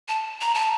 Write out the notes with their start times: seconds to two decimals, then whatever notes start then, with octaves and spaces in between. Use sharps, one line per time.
0.08 A5
0.41 A#5
0.54 A5